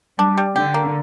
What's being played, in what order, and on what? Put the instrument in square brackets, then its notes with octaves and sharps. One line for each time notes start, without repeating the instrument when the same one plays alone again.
[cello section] G3 [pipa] D4
[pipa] G3
[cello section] D3 [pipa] G4
[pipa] A#3